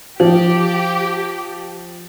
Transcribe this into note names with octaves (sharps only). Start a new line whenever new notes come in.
F3 G4